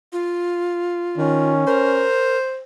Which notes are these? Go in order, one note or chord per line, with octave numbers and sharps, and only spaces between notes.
F4
D#3 C#4
A#4 C5